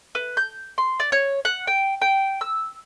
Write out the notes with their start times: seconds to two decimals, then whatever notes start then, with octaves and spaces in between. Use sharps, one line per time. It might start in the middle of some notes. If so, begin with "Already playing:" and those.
0.15 B4
0.37 G6
0.78 C6
1.00 D5
1.12 C#5
1.45 F#5
1.67 G5
2.02 G5
2.41 E6